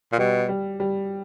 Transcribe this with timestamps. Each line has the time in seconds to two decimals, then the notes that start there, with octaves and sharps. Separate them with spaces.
0.12 A#2
0.18 B2 G3
0.49 G3
0.80 G3